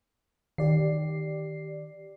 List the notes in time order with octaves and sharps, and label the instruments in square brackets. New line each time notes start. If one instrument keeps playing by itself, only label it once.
[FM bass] D#3 [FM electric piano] G4 D5 C7